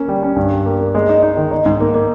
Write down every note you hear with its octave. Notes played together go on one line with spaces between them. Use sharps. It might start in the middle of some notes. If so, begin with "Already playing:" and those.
Already playing: A#3 C#4
G3
C#4
G2
G3
A#3
A#3
G#3
D#4
D#4
D#3
D#4
G#2
A#3
A#3